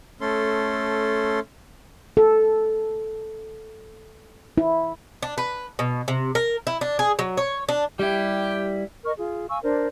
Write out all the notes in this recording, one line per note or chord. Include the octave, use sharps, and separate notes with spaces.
A3 C#4 A4 C6
A4
E4
D4
B4
B2
C3
A#4
E4
D4
G#4
F#3
C#5
D4
G3 E4 G4
A#4 D#5 C#6 F6
F4 G#4
F5 G#5 C#6 E6
D4 A#4 C5 D5